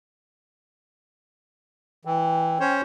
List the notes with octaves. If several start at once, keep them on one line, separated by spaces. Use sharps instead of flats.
E3 G5
C#4 C5 C#5